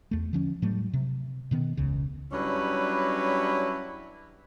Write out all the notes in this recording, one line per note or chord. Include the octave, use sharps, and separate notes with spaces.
E2 A3
D3 F3 C#4
A2 F#3 G3 A3
C3
B2 D#3 B3
E1 C#2 C#3
F#3 G3 C#4 D4 E4 B4